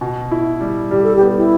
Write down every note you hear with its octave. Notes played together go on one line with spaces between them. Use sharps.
B2
E4
G3
G3 G4
A4
G4
B3
E4